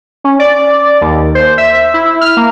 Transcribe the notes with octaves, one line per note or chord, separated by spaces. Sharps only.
C#4
D5
D#2
C5
E5
E4
F6
A#3